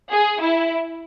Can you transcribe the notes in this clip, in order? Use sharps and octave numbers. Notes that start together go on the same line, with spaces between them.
G#4
E4